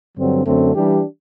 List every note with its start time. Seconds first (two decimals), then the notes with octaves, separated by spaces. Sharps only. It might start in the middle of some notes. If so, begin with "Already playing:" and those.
0.16 G2 D3 F#3 C4
0.45 F#2 D3 A3 C4
0.74 E3 G3 D4 G4